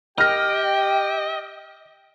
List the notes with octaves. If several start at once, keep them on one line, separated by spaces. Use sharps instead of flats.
G4 D#5 G5 F6 A#6